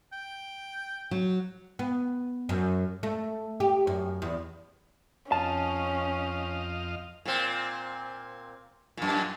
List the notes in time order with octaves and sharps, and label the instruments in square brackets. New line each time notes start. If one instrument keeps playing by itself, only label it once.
[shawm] G5
[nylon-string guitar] F#3
[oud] B3
F#2
A3
G4
F#2
E2
[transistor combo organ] F2 D#5 F5 [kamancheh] C#4 [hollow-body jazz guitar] A5
[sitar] A#2 C4
F#2 A#2